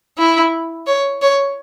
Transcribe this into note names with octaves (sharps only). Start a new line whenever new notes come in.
E4
C#5
C#5